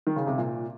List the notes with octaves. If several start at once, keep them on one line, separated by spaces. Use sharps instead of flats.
D#3
C#3
C3
A#2